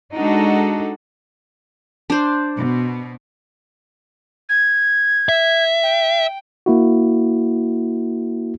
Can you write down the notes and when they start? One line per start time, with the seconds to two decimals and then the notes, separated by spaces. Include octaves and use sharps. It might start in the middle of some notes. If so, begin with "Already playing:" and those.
0.14 G#3 D4 D#4 F#4 A4
2.10 D4 C5
2.55 B2
4.49 G#6
5.29 E5
5.83 G5
6.66 A#3 E4 F#4